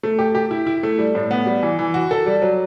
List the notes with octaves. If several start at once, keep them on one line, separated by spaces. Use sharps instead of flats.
A3
G4
G4
E4
E4
A3
G3
A2
B3
G3
E3
E3
F#4
A4
G3
F#3